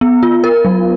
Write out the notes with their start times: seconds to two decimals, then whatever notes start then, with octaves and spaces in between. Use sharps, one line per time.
0.01 B3
0.23 F4
0.44 A#4
0.65 F#3